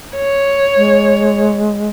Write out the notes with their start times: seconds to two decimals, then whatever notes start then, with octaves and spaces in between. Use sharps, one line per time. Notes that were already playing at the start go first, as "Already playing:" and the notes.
0.16 C#5
0.77 G#3